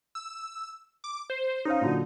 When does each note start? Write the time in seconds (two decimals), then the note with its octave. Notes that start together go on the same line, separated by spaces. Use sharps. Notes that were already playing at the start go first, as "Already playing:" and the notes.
0.15 E6
1.04 D6
1.30 C5
1.65 C#4 D#4 C5 F5
1.81 A#2 D3 F#3